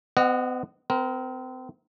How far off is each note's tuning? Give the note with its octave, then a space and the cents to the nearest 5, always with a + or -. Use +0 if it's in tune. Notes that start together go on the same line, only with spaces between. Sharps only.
B3 +45 D#5 -25 F#5 +0
C4 -30 A#4 +15